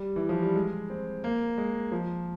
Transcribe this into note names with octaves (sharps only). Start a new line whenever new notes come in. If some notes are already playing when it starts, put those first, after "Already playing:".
Already playing: G3
E3
F3
G3
G#3
C4
A#3
G#3
F3